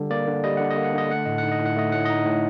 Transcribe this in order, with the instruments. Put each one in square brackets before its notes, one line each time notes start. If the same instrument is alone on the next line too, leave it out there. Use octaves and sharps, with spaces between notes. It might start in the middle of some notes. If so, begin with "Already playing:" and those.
Already playing: [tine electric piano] D3 G3
A#3 D5
D3
G3 D#5
D3 F#5
D#5
A#3
F#5
D3 D#5
A3 F#5
A2 D#5
F#5
D#4
D#5
A2
F#5
A3 D#5
A2 F#5
D#4 D#5
A2